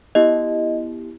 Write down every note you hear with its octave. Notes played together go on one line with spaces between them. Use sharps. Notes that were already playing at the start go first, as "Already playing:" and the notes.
B3 E4 G4 D#5